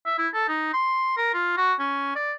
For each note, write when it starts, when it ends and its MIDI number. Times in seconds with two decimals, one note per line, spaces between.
0.05 0.14 76
0.18 0.28 64
0.34 0.47 69
0.48 0.70 63
0.73 1.17 84
1.17 1.32 70
1.34 1.55 65
1.57 1.74 66
1.79 2.15 61
2.16 2.32 74